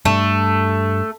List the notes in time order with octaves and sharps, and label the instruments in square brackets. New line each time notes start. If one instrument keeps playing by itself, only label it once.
[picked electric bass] G2 [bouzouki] A3